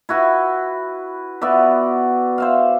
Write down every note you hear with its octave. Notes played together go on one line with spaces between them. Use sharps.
E4 F#4 B4
B3 F#4 D5 E5
C5 E5 F5